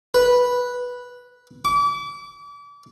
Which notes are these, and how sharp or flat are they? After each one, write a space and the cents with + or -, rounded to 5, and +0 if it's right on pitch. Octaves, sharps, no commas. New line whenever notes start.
B4 -5
D6 -35